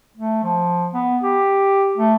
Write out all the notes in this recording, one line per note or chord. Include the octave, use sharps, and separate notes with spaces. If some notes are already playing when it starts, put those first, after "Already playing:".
A3
F3
B3
G4
A3